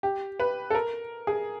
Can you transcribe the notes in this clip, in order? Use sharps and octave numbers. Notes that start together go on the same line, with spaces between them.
G4
B4
A4
A#4
G#4